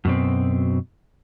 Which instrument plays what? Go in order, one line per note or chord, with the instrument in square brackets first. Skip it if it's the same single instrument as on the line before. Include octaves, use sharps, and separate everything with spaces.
[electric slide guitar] F#2 B2 C4